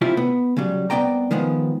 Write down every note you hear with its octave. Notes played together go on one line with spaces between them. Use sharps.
C3 E4 F4 G4
B3
C#3 F#3 G3
C2 C#3 B3 D5 G5 A#5
D#3 F3 G#3 B3